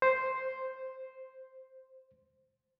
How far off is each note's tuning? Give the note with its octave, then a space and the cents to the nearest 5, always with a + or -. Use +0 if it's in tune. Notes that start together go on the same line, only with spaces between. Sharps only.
C5 +0